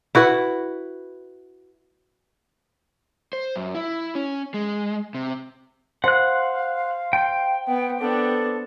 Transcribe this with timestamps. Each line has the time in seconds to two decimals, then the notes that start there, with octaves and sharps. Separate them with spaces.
0.15 E4 F#4 B4
3.33 C5
3.56 F#2
3.75 E4
4.15 C#4
4.54 G#3
5.14 C3
6.04 C5 F5 F#5 F#6
7.13 G5
7.68 B3 F#5
8.00 B3 D4 A4